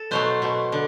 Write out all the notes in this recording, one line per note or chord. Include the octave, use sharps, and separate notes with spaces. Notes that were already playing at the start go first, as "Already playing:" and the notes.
Already playing: A4
B2 F#3 A3 C5
B2 A3
D3